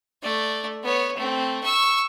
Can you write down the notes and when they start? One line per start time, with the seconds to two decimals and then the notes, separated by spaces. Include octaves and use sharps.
0.23 A3 D5
0.83 B3 C#5
1.17 A3 C4
1.64 C#6 E6